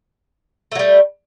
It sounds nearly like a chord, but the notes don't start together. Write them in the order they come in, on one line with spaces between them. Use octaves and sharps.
A3 F#3 G3